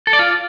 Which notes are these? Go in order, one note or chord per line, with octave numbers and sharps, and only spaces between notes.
A4
D5
F4